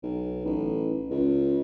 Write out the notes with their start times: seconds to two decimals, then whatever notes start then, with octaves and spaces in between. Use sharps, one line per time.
0.03 B1
0.46 A1
1.10 C#2